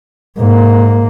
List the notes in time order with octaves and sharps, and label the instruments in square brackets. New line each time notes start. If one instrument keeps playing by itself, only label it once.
[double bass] G#2 A#3